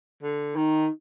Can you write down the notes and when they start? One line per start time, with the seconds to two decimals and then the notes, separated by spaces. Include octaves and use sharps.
0.23 D3
0.56 D#3 D#4